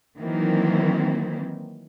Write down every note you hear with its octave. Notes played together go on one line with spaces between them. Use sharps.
D#3 E3 F#3 A#3 C4